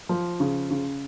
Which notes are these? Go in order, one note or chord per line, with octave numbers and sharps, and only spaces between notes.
F3
C#3
C#3